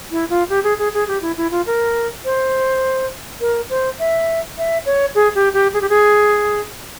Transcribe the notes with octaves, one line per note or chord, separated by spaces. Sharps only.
E4
F4
G4
G#4
G#4
G#4
G4
E4
E4
F4
A#4
C5
A#4
C5
E5
E5
C#5
G#4
G4
G4
G#4
G4
G#4